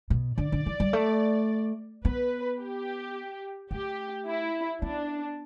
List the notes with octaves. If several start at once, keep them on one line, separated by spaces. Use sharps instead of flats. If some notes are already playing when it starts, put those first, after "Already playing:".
B2
D3 D5
D3
E3
G3
A3
B3 B4
G4
A3 G4
E4
B3 D4